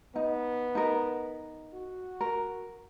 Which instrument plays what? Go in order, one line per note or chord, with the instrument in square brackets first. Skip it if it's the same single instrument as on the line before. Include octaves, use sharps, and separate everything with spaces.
[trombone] B3 [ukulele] D#4
[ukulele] D#4 A#4
[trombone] F#4
[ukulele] A#4